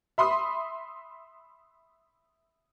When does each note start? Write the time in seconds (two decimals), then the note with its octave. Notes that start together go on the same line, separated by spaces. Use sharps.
0.18 E5 B5 C6 D#6